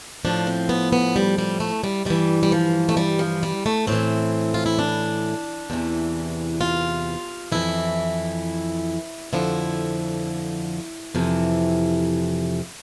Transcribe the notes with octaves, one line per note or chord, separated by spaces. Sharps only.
A2 F3 D4
C4
B3
B3
G3
G3
A3
G3
G2 E3 G3
G3
F3
A3
G3
F3
G3
A3
A2 E3 C4
F4
E4
D4
E2 C3 E3
F4
F2 E3 E4
F2 D3 F3 E4
F2 C3 E3